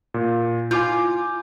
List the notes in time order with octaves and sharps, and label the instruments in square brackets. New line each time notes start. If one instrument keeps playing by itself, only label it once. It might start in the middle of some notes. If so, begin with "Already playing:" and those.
[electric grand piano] A#2
[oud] F4 [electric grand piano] G#5 D6 G6